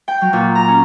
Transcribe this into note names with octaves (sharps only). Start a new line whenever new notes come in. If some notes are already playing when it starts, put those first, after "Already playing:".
G5
F#3
A#2
A#5
C#4